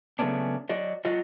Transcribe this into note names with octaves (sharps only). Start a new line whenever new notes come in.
C#3 F#3 A3 B3 C#4 D4
F#3 F#4 D5 D#5
F#3 F4 F#4 D#5